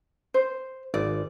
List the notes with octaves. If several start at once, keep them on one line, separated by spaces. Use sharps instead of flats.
C5
G#1 D5